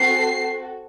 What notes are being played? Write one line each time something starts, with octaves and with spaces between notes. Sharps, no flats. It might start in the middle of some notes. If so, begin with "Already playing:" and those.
Already playing: C4 F#4 A4 C7